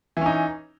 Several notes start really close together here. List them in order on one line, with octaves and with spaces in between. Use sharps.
E3 C#4 D#4